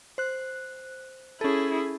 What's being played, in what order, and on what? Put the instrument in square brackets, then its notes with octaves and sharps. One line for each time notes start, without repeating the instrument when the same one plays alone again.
[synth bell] C5 F#6
[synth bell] C#4 A4 [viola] E4 G#4